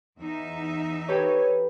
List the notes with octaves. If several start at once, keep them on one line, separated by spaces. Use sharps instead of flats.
E2 D#4 E5
G4 A4 B4 C#5